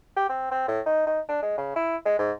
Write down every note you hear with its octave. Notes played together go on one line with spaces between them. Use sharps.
G4
C4
C4
A2
D#4
D#4
D4
G#3
C#3
E4
G#3
G#2